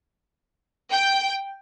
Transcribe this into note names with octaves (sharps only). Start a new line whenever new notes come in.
G5